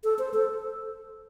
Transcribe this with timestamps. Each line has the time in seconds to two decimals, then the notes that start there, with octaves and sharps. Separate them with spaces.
0.04 A4
0.19 C5
0.34 A4